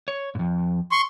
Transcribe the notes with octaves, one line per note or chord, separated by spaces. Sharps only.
C#5
F2 G#2
C6 C#6